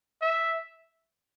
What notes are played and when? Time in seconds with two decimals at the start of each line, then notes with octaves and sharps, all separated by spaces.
0.21 E5